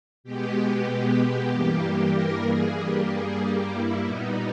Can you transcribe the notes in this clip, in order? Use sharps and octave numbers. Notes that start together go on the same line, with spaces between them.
B2 G#3 B3 G4
G2 E3 G3 A#3
A#4
G#4
G2 G3 A#3 G4
G#4
G4
E4
A#2 G3 B3 D#4